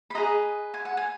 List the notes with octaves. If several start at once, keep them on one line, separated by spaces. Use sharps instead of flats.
B5
G#4 B4 D#5 A#5
G#5
F#5
G#5